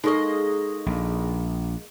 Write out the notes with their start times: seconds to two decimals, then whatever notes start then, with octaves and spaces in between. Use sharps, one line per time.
0.04 G#3 A#3 D#4 A4 D#5 C#6
0.86 A#1